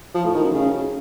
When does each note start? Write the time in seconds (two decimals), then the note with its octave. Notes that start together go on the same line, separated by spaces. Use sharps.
0.15 F3
0.24 A2
0.34 D#3
0.44 F#2
0.54 C#3